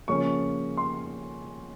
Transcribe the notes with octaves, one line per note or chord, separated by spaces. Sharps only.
C#3 F3 A#3 C#4 C#6
C6